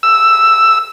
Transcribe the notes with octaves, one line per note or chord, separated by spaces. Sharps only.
E6